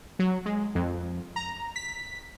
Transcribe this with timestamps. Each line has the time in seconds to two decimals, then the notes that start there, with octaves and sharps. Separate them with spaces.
0.19 F#3
0.46 G#3
0.75 F2
1.36 A#5
1.76 B6